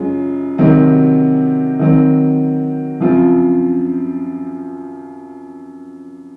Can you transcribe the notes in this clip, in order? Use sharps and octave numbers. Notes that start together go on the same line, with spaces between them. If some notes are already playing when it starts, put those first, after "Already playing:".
Already playing: F#2 C#3 G#3 C#4 F4
C3 D#3 F#3 C4
D#3 F#3 C4
F#2 C#3 F3 C4 F4